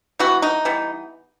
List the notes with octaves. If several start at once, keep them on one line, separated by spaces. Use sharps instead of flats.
E3 G3 B3 F#4
D#4
E3 G3 B3